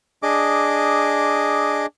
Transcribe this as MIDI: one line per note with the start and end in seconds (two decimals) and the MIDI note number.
0.23 1.86 62
0.23 1.86 68
0.23 1.86 75
0.23 1.86 86